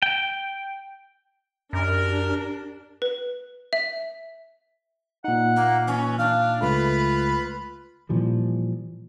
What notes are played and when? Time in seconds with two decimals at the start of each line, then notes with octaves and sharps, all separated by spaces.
0.02 G5
1.73 F#2 D4 G4 A#4
3.02 B4
3.73 E5
5.24 A#2 D#4 F#5
5.56 A#3
5.88 E3 C#4
6.19 D4 F5
6.62 C#2 A3 F4 B4
8.09 A#2 E3 F3 G3